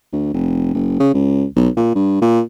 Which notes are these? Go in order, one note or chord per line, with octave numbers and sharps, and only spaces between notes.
D2
F1
F#1
C#3
C#2
B1
A#2
G2
A#2